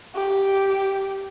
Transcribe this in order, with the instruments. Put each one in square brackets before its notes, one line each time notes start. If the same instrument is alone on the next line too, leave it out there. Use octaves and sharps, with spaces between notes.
[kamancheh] G4